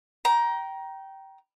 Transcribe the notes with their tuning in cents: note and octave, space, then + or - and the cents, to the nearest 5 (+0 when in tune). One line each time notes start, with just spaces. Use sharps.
G5 -15 A#5 +20